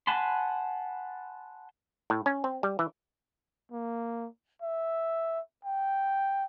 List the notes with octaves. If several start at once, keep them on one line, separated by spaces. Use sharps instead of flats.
F#5 G#5 A5 B5 C6
A2
C#4
C4
G3
E3
A#3
E5
G5